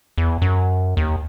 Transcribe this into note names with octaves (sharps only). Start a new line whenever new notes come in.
E2
F#2
D#2